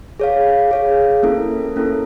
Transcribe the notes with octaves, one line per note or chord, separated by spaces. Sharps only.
G#4 C#5 F5
G#4 C#5 F5
A#3 C#4 E4 A4
A#3 C#4 E4 A4